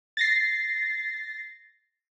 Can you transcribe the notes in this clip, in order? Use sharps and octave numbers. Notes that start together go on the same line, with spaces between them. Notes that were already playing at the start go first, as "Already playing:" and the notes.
A6 A#6 C7